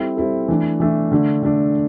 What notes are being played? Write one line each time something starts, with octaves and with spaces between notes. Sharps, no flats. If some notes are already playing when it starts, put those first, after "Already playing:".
Already playing: G3 C4 E4 A4
G3 C4 E4 A4
E3 A3 D4
E3 A3 D4
D3 A3 D4
D3 A3 D4